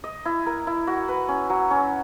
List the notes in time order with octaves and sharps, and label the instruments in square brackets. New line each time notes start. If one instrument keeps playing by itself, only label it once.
[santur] D#5
E4
A#4
E4
F#4
B4
C#4
F#3
C#4